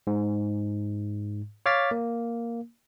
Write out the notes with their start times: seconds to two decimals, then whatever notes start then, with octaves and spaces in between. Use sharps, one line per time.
0.07 G#2
1.66 C#5 F5 D6 F6 A6 B6
1.91 A#3